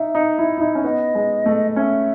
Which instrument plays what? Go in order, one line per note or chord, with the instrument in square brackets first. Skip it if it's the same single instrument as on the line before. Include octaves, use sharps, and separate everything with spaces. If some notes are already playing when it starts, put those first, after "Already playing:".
Already playing: [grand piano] D#4 [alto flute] E5
[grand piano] D#4
E4
E4
D#4
C#4
[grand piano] B3 [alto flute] D#5
[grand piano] G#3
A3
[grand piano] C#4 [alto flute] E5